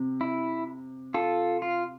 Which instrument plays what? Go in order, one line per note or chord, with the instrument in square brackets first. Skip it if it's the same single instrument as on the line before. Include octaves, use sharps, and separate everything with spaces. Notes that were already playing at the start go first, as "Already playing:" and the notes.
Already playing: [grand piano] C3
[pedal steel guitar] E4
F4 A4
F4